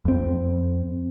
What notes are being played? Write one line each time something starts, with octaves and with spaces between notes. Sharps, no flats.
F2 C4